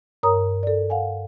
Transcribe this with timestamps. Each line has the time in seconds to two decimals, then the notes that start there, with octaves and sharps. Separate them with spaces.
0.23 G2 A#4 C#5 A#5 D#6
0.63 A4 D5
0.90 F5 F#5 G#5